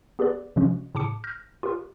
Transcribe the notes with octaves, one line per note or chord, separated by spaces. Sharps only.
B3 G4 G#4 B4 D5
C3 F3 G#3 C#4 F#4
A2 C#3 A5 D6 C#7
F6 G6 A#6
F4 G4 G#4 A#4